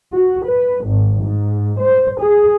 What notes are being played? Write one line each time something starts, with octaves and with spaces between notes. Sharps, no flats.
F#4
B4
G#1
G#2
C5
G#4